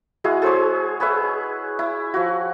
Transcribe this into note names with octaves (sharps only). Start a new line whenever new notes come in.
G#3 E4 F#4 G#4
G#4 C5 C#5
G#4 B4 C#5 E5
E4
F3 F#4